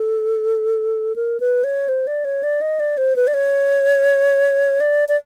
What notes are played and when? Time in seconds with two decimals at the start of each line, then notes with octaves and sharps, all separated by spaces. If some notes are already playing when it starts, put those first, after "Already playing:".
Already playing: A4
1.16 A#4
1.40 B4
1.64 C#5
1.88 C5
2.07 D5
2.25 C#5
2.43 D5
2.61 D#5
2.80 D5
2.97 C5
3.16 B4
3.27 D5
3.34 C#5
4.80 D5
5.08 D5